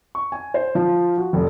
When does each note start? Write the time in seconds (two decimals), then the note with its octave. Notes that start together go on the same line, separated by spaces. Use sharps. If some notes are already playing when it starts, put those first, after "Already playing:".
0.15 C#6
0.32 G#5
0.54 C5
0.75 F3
1.17 F#4
1.33 F1